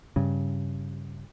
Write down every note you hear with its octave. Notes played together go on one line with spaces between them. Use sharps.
G2 C#3